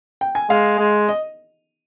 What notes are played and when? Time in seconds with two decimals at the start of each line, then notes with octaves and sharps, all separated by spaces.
0.21 G5
0.35 G#5
0.49 G#3 F5
0.79 G#3
1.09 D#5